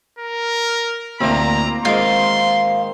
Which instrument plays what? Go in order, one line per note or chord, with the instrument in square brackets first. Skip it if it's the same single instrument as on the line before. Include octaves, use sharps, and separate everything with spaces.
[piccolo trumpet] A#4
[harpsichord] D2 A2 D3 [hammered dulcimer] A#3 C4 [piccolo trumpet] A#5
[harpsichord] G#2 D#3 [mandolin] F4 [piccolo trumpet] C6